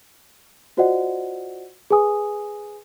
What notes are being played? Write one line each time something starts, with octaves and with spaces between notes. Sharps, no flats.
F4 F#4 C5 D5 D#5 F#5
G#4 B4 G#5 D#6